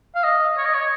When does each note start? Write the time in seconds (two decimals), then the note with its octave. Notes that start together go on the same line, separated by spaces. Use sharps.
0.15 F5
0.24 D#5
0.57 C#5
0.65 D#5
0.74 C#5